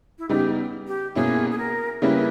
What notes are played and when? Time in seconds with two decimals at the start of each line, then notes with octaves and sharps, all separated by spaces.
0.18 E4
0.29 C#3 G3 B3 D#4 G4
0.87 G4
1.15 B2 A#3 C#4 E4 G#4
1.51 G#4
1.58 A#4
2.02 C#3 G3 A#3 C#4 E4 B4